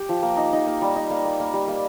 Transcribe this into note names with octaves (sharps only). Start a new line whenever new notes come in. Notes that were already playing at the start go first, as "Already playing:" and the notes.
Already playing: G4
F3
A#3
D#4
D#4
A#3
G3
D#4
A#3
A#3
A#3
G3
A#3